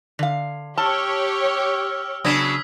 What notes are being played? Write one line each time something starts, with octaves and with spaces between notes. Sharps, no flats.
D3 F5
G4 C#5 A5 E6 F6
C#3 F#3 B3 D4 D#6 G#6 B6